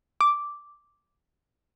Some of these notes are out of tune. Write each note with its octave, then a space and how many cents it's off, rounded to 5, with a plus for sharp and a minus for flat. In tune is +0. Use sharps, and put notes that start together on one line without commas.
D6 -5